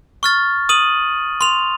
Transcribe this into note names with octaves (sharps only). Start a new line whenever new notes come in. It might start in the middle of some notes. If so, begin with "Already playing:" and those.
C#6 F6 A6
D#6 D#7 F#7
C6 F7